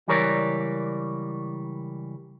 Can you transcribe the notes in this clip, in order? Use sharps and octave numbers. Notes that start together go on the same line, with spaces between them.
C#2 E3 G3 A#4 C#5 D5